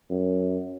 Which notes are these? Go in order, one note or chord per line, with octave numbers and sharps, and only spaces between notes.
F#2